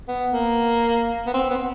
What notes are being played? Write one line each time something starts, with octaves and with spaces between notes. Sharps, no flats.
B3
A#3
B3
C4
B3